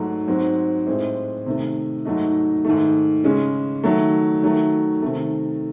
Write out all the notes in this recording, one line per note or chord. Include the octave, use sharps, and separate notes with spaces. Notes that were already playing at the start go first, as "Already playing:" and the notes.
Already playing: G#2 F#3 A3
G#2 F#3 C4
A2 G#3 C4
C3 D#3 A3
G#2 F#3 A3 D#4
G#2 D#3 A3
C#3 G#3 C#4
D#3 F#3 A3
D#3 F#3 A3
C3 D#3 A3